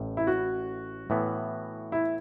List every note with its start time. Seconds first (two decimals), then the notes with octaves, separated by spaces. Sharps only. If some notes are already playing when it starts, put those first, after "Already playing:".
Already playing: A1 A2
0.17 E4
0.27 F#4
1.10 A2 E3 B3
1.92 E4